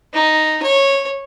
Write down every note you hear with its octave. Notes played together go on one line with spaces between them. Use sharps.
D#4
C#5